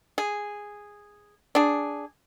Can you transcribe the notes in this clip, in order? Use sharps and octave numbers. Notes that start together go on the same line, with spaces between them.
G#4
D4 G#4